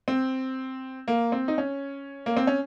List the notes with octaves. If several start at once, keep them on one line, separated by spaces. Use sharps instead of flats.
C4
A#3
C4
D#4
C#4
A#3
C4
C#4